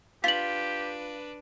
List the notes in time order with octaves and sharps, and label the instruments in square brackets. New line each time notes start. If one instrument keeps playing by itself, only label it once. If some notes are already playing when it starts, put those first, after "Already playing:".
[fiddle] D4 B4 [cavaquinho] F4 [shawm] G4 [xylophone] B6 F#7